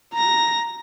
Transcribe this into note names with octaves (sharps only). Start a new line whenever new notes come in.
A#5 A#6